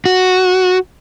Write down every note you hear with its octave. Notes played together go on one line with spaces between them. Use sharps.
F#4